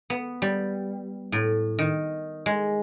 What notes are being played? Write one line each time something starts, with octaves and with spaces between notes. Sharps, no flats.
B3
G3
A2
D#3
G#3